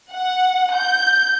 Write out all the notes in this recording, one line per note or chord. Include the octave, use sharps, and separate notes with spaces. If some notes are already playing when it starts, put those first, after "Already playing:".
F#5
G6